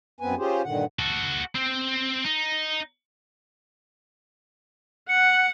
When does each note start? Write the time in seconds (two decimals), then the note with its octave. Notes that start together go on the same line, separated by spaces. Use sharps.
0.20 F#2 B3 C4 B4 G#5
0.38 C#4 F4 G4 G#4 C5
0.64 G2 A#2 D3 D#3 F#5
0.99 F#4 A4
1.55 C4
2.25 D#4
5.09 F#5 C#7